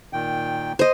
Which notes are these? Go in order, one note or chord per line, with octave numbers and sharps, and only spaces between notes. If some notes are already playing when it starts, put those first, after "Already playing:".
A#2 D#3 G5
C5 D#5